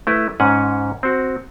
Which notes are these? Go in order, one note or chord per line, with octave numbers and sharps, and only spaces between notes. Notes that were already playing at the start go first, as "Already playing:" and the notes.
A3 E4 B4
G#2 C#4 F#5 G#5
C4 F#4